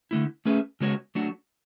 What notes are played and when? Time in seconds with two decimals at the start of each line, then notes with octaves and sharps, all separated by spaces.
0.11 D3 A3 E4
0.45 A3 C#4 G#4 B4 E5
0.80 C#3 G#3 B3 F#4 C#5
1.15 F#3 A3 D4 F#4